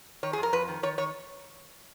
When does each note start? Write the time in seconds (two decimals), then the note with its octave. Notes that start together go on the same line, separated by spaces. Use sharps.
0.23 D#3 C#5
0.33 G#4
0.38 F2
0.43 A#4
0.53 F2 B4
0.68 D#3
0.83 D#3 C#5
0.98 D#3 C#5